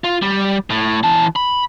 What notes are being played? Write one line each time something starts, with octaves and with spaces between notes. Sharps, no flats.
F4
G3
A2
E3 A5
B5